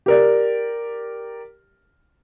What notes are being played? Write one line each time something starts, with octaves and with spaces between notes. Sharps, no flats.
G4 A#4 D5